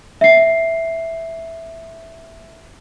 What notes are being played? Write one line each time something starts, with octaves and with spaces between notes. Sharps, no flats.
E5 C7